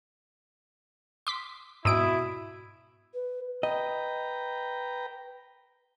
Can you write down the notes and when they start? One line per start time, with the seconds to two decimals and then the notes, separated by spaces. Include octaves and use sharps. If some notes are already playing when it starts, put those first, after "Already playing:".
1.27 C6 D6 B6
1.85 G#2 B2 E4 D#6 E6 D7
3.14 B4
3.63 B4 D#5 G5 A#5